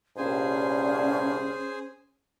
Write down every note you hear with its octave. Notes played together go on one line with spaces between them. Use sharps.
C2 G2 A#2 C#4 G#4 C5 G#5